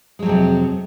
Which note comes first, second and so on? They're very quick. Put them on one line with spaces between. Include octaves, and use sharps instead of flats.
G#3 F#3 F2 C3